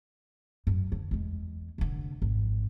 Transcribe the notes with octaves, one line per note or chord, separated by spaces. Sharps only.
F#2
D3
E2 G#3
F1 D3
G#1 F2